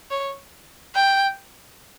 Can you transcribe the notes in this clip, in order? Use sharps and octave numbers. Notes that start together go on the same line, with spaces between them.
C#5
G5